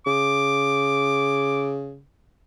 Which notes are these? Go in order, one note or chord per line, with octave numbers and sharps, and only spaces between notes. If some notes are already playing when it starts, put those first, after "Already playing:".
C#3 D6